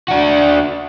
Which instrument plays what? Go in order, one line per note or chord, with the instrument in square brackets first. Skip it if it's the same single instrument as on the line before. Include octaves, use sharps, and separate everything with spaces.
[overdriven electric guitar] D4 F#4